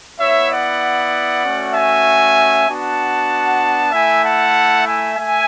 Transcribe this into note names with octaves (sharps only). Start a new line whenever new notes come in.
B3 E4 C#5 E5
D5 F#5
A3 C#4 F#4
E5 G#5
B3 D4 F#4 F#5 A5
A3 E4 E5 G#5
F#5 A5
E5 G#5
A3 E5 G#5